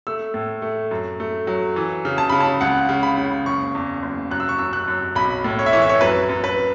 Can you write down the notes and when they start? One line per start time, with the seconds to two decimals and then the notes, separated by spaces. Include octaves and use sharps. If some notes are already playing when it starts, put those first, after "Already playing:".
0.07 A3 E6
0.34 A2
0.62 A3
0.91 F#2
1.20 A3
1.47 F#3
1.76 E3
2.05 C#3
2.18 A5
2.30 C#3 B5
2.40 A5
2.61 C#2 F#5
2.89 C#3
3.03 B5
3.18 C#3
3.46 F#1 C#6
3.75 E2
4.02 F#1
4.31 F#2 F#6
4.40 E6
4.49 C#6
4.59 F#2 E6
4.73 F#6
4.88 F#2
5.15 B1 B5
5.44 A2
5.59 C#5
5.66 E5
5.73 E3 C#5
5.82 E5
5.89 C#5
6.01 F#2 B4
6.29 F#2
6.44 B4